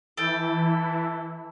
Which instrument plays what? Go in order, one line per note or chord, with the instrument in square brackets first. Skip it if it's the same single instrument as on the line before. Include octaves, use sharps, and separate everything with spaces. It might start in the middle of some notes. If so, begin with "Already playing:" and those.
[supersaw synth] E3 E4 [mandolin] A4 G5